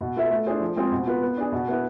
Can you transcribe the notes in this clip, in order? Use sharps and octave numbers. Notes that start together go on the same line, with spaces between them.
B2
B3 F4 A4 E5
A3
D4 F4 G#4 C5
F3
G#3 C4 F4 G#4
B2
B3 F4 B4
B3
D4 G#4
B2
B3 E4 B4